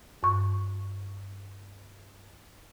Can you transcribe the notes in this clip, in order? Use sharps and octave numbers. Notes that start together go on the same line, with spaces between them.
G2 C#6